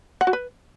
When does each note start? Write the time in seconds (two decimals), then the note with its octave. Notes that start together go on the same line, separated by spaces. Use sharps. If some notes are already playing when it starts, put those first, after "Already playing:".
0.21 F#5
0.27 F#4
0.33 B4